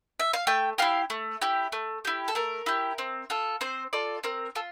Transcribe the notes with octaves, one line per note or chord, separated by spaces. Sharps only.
E5
F5
A3 G5
E4 G4 F5
A3
E4 G4
A3
E4 G4
A4
A3 A#4
E4 G4
C4
F4 A4
C4 C5
F4 A4 D5
C4 A#4
F4 A4